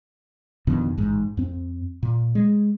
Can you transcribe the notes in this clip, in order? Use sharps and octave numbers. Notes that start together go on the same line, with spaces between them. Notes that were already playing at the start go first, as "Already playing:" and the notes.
F2 B2 D3 D#3
A1 G#2
F2 C4
A#2
G#3